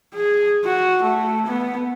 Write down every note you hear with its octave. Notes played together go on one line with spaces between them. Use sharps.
G#4
F#4
A3
B3